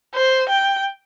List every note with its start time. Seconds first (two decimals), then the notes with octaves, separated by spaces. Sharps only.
0.15 C5
0.49 G5